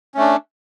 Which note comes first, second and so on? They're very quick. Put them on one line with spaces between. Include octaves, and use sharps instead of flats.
C#4 A3 D4